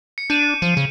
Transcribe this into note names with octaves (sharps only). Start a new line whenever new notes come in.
C#7
D4 G6 D#7 E7
F3 D#7
C#3